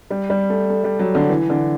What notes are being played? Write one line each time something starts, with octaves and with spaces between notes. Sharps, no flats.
G3
G3
A3
A3
G3
F#3
D3
E3
D3